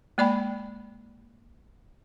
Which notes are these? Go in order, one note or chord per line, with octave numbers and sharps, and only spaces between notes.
G#3 A#3 D5 G5 B5